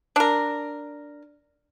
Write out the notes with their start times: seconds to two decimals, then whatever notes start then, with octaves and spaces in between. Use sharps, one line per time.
0.16 D4 A#4